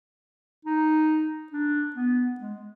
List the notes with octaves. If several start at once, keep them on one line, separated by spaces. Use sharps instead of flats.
D#4
D4
B3
G#3